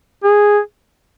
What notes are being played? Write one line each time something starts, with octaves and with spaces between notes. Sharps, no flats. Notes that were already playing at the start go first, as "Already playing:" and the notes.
G#4